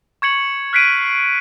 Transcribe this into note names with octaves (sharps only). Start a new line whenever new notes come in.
C#6 G#6 C#7 F#7
F6 F#6 B6 C7 D7 D#7